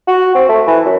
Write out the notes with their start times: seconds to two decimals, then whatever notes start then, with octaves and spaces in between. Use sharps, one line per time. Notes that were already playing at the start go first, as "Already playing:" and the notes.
0.07 F#4
0.35 C4
0.49 A3
0.67 E3
0.86 F#2